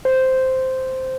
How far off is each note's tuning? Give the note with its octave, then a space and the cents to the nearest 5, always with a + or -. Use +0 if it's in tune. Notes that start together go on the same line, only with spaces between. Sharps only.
C5 -5